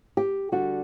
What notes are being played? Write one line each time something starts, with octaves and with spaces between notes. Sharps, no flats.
G4
D3 G3 D4 F#4